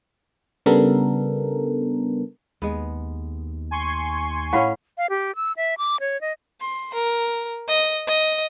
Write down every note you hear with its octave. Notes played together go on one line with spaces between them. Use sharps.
C#3 G3 B3 D4 A4 A#4
D#2 G#3 B3
G#5 C6 C#6
A2 C#4 F5 F#5 B5
F5
G4
E6
E5
D6
C#5
D#5
C6
A#4
D#5
D#5